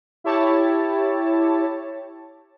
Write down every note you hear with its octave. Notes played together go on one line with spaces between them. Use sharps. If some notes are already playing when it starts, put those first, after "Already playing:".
E4 G4 C#5 A5